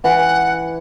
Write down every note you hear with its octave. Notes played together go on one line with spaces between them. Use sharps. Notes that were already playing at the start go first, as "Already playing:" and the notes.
E3 F#5